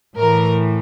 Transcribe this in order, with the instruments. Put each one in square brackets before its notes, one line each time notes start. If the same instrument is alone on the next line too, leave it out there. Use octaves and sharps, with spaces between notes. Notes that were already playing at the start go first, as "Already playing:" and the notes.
[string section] A2 E3 A#4